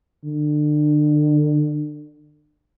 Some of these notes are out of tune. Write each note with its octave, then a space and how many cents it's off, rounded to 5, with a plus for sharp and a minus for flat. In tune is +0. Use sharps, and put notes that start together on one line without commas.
D3 +30